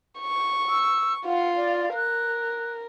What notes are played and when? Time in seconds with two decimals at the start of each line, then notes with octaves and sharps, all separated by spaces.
0.20 C#6
0.69 E6
1.26 F4 F5 F#5
1.56 D5
1.94 A#4 F#6